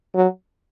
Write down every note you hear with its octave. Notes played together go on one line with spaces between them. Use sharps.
F#3